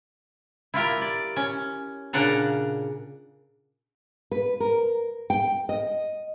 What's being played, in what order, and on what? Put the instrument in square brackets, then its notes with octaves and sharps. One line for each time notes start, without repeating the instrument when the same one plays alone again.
[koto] E4 F4 G4 A#4
D5
C#4
A#2 C#3 D4 F#5 A#5
[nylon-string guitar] B4
A#4
G5
D#5